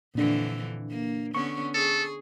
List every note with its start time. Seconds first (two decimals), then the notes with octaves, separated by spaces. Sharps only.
0.15 F2 A#2 D3 E3 D4
0.89 A#3
1.35 D3 B3 C#4 C#6
1.74 G#4 A4